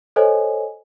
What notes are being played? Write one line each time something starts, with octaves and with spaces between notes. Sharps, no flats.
A4 C5 C#5 D#5 G#5